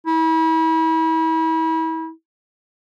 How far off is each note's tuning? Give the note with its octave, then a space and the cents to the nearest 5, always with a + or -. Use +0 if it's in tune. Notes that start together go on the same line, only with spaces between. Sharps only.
E4 -35